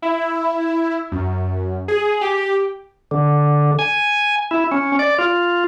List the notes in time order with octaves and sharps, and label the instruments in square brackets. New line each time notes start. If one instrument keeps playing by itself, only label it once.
[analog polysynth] E4
F#2
G#4
G4
[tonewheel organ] D3
G#5
E4
C#4
D5
F4